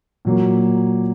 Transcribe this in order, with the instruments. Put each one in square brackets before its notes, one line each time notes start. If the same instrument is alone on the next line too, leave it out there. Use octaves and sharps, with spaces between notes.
[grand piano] A#2 F#3 A#3